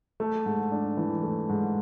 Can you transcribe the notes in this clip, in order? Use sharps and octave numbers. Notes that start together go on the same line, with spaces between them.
A3
G#2
D4
E3
A3
G#2